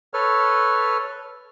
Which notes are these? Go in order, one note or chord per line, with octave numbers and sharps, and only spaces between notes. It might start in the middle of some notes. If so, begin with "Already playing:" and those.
A4 B4 C#5 F6